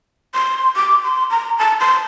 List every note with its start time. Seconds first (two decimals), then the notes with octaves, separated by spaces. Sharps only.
0.35 C6
0.76 D6
1.04 C6
1.31 A#5
1.59 A5
1.80 C6